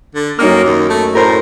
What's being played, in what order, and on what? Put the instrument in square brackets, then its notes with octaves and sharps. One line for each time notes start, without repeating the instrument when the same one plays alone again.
[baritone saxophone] D3
[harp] F#2 D#4 F6 [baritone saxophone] A#3
[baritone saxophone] D#2
A3
[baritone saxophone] A2 [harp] A#4 C5 A#5